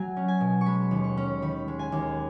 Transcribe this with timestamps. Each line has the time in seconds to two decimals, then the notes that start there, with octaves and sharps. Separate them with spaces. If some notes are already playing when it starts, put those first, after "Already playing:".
Already playing: F#3 F#5 G#5
0.17 C#4
0.28 G#5
0.41 B2
0.61 C#6
0.66 G#3 B5
0.91 D#2
1.04 C#6
1.17 C#4
1.42 D#3 B5
1.68 G#3
1.79 G#5
1.92 D#2